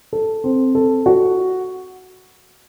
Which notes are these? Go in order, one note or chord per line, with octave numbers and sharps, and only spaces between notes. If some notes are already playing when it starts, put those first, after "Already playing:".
A4
C4
A4
F#4